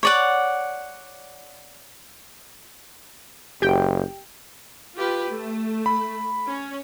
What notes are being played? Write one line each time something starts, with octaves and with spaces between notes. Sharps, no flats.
C#5 D5 F#5
F#1 G4 G5
F4 G4 B4
A3
B5
C#4